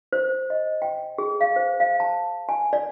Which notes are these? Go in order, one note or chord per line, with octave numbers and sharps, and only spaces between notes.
C5
D#5
G5
G#4
F5
C5
F5
A5
G#5
D5